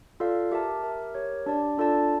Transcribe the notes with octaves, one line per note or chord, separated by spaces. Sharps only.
F4 A4 D5 F5
G4 A#4 E5 A5
G4 A#4 E5
G4 A#4 C#5
D4 G4 D5 A5
D4 F4 A4 D5 A5